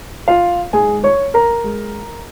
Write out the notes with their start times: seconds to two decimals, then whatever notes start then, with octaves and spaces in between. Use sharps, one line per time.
0.28 F4 F5
0.73 G#2 G#3 G#4 G#5
1.04 C#5 C#6
1.34 A#4 A#5
1.64 G#3